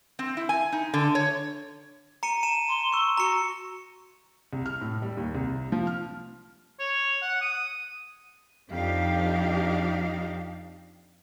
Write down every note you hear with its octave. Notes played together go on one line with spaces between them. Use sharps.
C4
E4
G#5
D#4
D3
C#5
A#5 C#7 D#7
A5 D#7 E7
C6
C#6 E6
F#4 A#5 C#7
C2
F6
A2
G3
D#2
C2
F3
F6
C#5
F#5
D#6
F2 D4 D#4 G4 F5